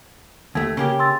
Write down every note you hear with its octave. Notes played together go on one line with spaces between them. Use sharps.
D#2 A3 G#6
C#3 A#3 G4
C6 E6 A6